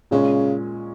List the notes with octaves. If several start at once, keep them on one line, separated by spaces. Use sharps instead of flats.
A#2 C#3 G#3 C#4